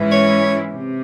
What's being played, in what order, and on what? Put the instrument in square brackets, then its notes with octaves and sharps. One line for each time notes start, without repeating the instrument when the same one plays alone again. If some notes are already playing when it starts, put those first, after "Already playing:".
Already playing: [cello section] G#2 E3 G#3 C#4 E4
[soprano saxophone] C#5
[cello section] C3